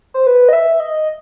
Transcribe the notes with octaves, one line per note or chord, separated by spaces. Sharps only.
C5
B4
D#5
E5
D#5